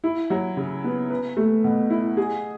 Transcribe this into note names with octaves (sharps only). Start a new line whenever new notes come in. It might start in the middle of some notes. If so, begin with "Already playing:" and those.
E4
F#3
C#3
B3
B4
A3
B2
E4
G#4